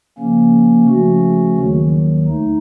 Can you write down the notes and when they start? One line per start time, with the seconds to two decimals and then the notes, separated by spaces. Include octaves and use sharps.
0.18 C#3 F3 A#3 C#4
0.88 C#3 F3 A3 C#4 F#4
1.58 D#2 D#3 F#3
2.28 A3 D#4